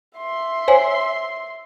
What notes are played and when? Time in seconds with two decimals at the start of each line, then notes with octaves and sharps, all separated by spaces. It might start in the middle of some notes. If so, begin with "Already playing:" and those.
0.17 E5 C6
0.68 C5 C#5 G#5